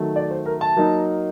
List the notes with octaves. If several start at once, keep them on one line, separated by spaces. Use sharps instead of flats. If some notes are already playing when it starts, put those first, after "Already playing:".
Already playing: D#3 F#3 A3
D5
C5
A#4
A5
F#3 A#3 D#4